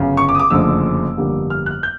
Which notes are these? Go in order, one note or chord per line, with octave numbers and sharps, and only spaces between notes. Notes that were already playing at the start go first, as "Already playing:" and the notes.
Already playing: G1 F#2 C#3
C#6
D6
D#6
D6
F#1 F2 D3 F3 A3 E6
G1 F2 D3 G3 A#3
F6
F#6
G6